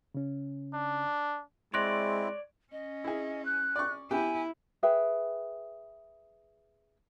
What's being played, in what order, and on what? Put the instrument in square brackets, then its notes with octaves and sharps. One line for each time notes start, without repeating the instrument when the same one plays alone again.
[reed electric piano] C#3 C#4
[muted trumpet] D4
[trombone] G#3 [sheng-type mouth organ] C4 E4 [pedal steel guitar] C#5 D5 [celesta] C6 F#6 A#6
[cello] C#4 [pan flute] D#5
[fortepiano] E4 G#4
[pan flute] F#6
[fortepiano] D5 C#6
[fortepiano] B3 G4 G5 [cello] E4 [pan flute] G#5
[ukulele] G#4 B4 E5 G5